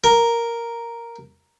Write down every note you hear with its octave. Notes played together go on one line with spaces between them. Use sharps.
A#4